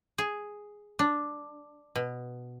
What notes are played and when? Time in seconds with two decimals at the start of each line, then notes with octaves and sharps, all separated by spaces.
0.18 G#4
0.99 D4
1.96 B2